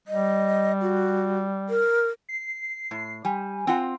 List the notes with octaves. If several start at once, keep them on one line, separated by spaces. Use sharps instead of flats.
G3 D#5
F#4
A#4
C7
A2
G3 G#5
C4 F4 F#5